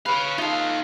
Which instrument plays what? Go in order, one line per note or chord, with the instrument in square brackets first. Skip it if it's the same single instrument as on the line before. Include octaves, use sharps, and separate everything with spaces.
[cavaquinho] B4 [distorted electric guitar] C#5 F5
[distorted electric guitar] D#4 F5 [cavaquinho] F4 A4